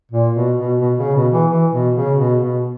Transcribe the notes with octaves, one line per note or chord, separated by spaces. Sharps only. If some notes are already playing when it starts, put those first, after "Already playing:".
A#2
B2
B2
B2
C#3
B2
E3
E3
B2
C#3
B2
B2